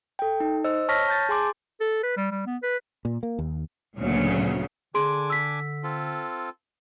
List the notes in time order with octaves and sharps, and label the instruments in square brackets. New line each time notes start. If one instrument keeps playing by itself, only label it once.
[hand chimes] A4 G5
D#4
C5 D#5 E6
C#5 A5 C#6 F6 A#6 B6
A5 G6 A6
G#4 G#5 C6 D6
[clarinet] A4
B4
G3
G3
B3
B4
[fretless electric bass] A#2
A#3
D#2
[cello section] D2 A#2 C#3 F#3 B3
[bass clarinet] D3 [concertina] D4 G#5 D6 [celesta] G#4 C6 D7
[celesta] E6 B6
[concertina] C4 F4 A4